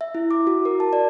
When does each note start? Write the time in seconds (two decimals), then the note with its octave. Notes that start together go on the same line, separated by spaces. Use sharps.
0.01 E5
0.15 E4
0.31 D6
0.47 F#4
0.65 A#4
0.80 A5
0.93 D5